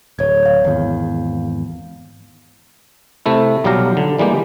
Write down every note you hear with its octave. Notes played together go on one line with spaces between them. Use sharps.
D1 C#5 G#6
F5 G6
G#1 E2
C3 A3 E4
B1 F#3 G3 G4 F5 A#5
D3
E3 G3 G#3 A#3 G4